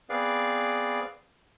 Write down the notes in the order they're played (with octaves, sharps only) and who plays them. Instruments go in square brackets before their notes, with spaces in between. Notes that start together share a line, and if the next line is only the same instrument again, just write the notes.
[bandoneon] B3 C4 G#4 B4 D5 F5